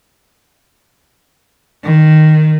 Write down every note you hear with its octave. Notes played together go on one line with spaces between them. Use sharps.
D#3